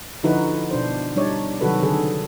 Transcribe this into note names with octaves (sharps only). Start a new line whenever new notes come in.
D3 F3 D#4 E4 F#4 B4
B2 D4 C5
G3 D4 D#4 C#5 D5
C3 D#3 F#3 F#4 A4 B4
D3 D#3 G#4 A4